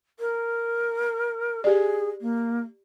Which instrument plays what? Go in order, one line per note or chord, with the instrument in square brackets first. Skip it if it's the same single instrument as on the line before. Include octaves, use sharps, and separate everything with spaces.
[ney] A#4
[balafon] G4 D5 [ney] G#4
[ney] A#3